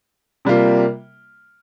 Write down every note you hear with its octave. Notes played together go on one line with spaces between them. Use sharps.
C3 G3 A#3 F4